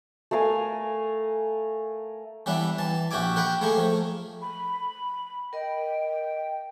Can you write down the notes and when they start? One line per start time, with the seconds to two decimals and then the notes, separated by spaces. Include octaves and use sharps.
0.31 A3 A#4 F5 G#5
2.46 E3 G3 B3 D4 E5
2.78 E3 A5
3.11 A#1 F#4 G4 E5 G#5 D6
3.36 G4 A#4 F#5 G5 B5
3.61 A3 A#3 G#4 A#4
3.77 F3 A3
4.42 B5
5.53 A#4 D#5 G5